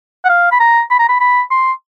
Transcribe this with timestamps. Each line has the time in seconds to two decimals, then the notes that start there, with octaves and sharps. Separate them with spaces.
0.25 F#5
0.29 F5
0.52 B5
0.60 A#5
0.91 B5
0.99 A#5
1.09 B5
1.20 B5
1.51 C6